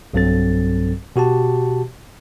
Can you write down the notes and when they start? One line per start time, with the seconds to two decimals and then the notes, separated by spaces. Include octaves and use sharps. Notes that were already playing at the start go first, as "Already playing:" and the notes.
0.13 B1 G2 F#3 C4 A4 A6
1.16 B2 F#4 G4 A5